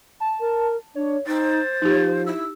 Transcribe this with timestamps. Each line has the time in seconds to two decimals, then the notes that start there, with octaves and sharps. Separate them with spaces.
0.20 A5
0.40 A#4
0.95 D4 C#5
1.27 D#4 C5 A6
1.82 F3 D#4 G4
2.26 E4 E6